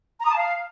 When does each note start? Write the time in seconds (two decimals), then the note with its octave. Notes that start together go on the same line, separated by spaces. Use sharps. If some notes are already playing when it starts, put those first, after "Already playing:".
0.20 A#5
0.26 D#6
0.31 A5
0.36 F5